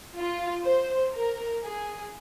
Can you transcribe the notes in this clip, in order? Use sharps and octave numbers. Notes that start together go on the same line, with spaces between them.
F4
C5
A#4
G#4